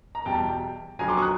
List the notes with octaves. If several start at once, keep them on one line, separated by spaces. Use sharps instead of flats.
A#5
E2 B2 G3 G5 A5
F2 D3 F#3 G#5 A#5
C6 D6
C#6 D#6
F#6